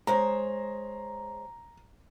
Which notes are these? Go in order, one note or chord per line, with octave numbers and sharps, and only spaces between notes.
G#3 C5 C#5 A#5